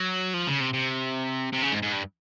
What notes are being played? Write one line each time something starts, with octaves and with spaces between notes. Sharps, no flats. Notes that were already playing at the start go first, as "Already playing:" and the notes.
Already playing: F#3
F3
C#3
C3
C3
C3
C#3
G#2
G#2
G2